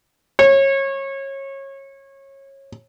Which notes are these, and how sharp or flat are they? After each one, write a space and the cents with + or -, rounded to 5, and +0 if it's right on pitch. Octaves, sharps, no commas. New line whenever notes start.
C#5 -25